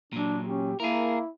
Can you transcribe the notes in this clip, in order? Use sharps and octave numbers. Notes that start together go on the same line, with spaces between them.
A#2 F#3 D4
C#4 G4
A#3 E4 G#4 A#4